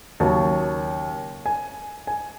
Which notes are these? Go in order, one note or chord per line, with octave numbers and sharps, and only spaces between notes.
D#2 C#3 F#3 C#4 A5
G#5
G#5